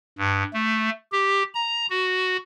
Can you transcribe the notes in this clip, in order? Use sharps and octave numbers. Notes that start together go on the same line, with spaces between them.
G2
A3
G4
A#5
F#4